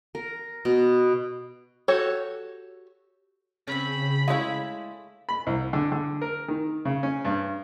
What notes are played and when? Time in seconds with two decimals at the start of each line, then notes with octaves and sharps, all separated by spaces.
0.15 A#4
0.65 B2
1.88 F#4 G4 A4 C#5
3.67 C#3 C4 C#4 B5
4.28 G#3 A3 E4 C#5 F5
5.29 B5
5.47 C2
5.73 D3
5.92 D3
6.21 A#4
6.48 D#3
6.85 C#3
7.03 C#4
7.25 G2